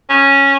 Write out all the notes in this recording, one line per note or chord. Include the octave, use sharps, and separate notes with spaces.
C#4